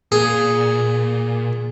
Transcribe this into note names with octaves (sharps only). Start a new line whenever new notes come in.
A#2 G#4